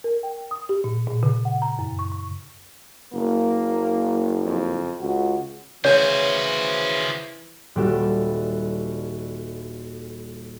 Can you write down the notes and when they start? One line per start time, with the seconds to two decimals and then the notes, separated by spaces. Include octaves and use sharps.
0.04 A#4
0.23 G5
0.51 D#6
0.69 G4
0.84 A#2
1.07 A#2
1.23 C#3
1.45 F#5
1.62 A#5
1.79 F#2
1.99 C#6
2.12 C#6
3.14 F#1 A#3
4.44 F2
5.01 C#2 F#4
5.85 C#3 E3 F#4 C5 C#5 G#5
7.76 D#1 G3 F#4 G4 A4 E5